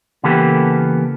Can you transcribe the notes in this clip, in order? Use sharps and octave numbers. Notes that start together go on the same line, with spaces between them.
C#3 E3 A#3 B3 G4 A4